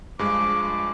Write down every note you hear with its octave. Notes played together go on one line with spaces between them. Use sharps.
G2 F3 G#3 D6